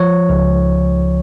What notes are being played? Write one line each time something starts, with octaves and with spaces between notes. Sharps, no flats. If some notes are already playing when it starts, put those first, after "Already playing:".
Already playing: F3 C#5
C#2